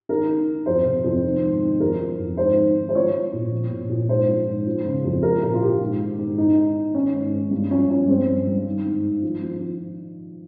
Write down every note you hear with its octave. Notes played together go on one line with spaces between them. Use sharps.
D#3 A#4
D#3
D#3
F2 C5
C3
F2
D#3
G#2
D#3
F2 A#4
F3
F2
G#2 C5
D#3
D#3
C5
F3 C#5
F3
A#2
F3
A#2
A#2
G#2 C5
F3
G#2
F3
C#3
F2
F3 A#4
A#2 A#4
F4
A#2 G4
G#2
D#3
G#2
G#2 D#4
D#3
D#3
D#3 C#4
G#2
G#2
G2
F3 C#4
F3 C#4
G2 C4
G2
G2
D#3
G#2
D#3
F3
F3
F3